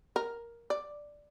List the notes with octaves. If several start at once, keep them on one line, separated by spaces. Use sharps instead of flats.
A#4
D5